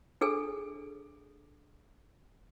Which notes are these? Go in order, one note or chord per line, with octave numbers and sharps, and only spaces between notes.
D4 G#4 A4 G#5